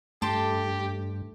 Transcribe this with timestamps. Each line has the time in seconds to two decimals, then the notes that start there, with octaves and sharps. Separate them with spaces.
0.22 G2 A3 G4 A5 C6 D6